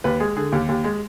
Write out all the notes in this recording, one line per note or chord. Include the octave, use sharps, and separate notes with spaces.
D#2 B4
G#3 G#4
D3 G#4
D#2 G4
D#2
G#3